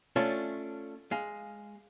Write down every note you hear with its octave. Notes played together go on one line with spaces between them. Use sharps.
A3 C#4 D4 F4
G#3 F5